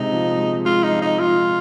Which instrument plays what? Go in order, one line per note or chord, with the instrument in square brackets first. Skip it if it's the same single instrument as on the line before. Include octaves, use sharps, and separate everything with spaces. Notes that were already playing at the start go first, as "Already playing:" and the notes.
Already playing: [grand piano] C3 G#3 [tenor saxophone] D#4
[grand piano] F3
G#3
[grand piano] G#3 [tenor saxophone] F4
[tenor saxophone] D#4
[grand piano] F3
[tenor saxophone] D#4
[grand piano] G#3 [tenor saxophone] F4